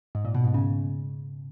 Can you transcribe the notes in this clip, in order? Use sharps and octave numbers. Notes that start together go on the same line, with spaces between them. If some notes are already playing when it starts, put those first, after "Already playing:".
G#2
A#2
B2
G#2
C#3